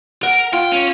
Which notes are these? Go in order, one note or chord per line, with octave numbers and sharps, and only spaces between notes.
A#4 F#5
F4 G5
C#4